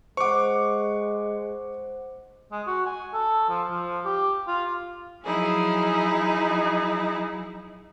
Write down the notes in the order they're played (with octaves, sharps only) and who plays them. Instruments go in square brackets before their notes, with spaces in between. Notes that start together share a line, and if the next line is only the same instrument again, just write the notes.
[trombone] G#3 [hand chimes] C5 F#5 [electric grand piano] C#6 D6
[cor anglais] G#3
F#4
G#5
A4
F3
F3
G4
F4
[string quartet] F3 F#3 D#4 E4 G#4